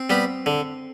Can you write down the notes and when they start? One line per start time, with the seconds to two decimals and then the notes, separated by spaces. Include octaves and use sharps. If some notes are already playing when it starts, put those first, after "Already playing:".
Already playing: C4
0.10 G3 B3
0.46 D3